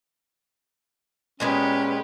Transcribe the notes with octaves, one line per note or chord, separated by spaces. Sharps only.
A#2 G#3 B3 C#4 G4 B4